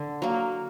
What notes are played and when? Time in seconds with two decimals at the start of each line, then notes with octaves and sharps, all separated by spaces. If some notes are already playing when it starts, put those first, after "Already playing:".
Already playing: D3
0.22 F#3 A#3